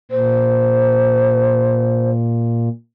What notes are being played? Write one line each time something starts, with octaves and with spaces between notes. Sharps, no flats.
A#2 C5